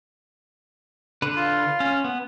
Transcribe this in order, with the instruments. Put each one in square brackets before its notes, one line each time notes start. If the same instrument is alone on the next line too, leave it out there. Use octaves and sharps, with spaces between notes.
[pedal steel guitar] D3 B4
[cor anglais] F4
[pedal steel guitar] C#4
B3